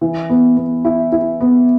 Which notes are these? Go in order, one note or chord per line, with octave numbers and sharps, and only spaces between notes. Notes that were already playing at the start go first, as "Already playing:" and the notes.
E3
B3
B3
E4
E4
B3